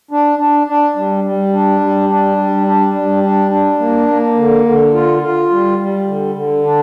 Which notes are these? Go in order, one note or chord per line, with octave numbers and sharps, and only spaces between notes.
D4
D4
D4
G3
G3
D4
G3
D4
G3
D4
G3
D4
D4
A#3
A#3
D3
D3
F4
F4
G3
G3
D3
D3
D4